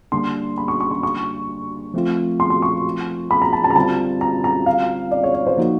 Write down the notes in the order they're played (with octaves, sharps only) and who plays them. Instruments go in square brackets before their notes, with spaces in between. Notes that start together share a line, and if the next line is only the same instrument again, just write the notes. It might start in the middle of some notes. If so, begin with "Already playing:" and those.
[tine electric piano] D3 G3 A#3 D4 [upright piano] C6
[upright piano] B5
C#6
C#6
C6
C#6
[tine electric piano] F3 A3 C4 F4
[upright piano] C6
C6
C#6
B5
A#5
A5
A5
A#5
[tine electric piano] D3 G3 C4 F4 [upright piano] A5
[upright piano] A#5
A#5
F5
D5
C#5
C#5
C5
[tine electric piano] F3 A#3 D#4 F#4